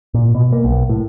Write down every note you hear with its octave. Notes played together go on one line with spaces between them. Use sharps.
A#2
B2
A#3
B1
A2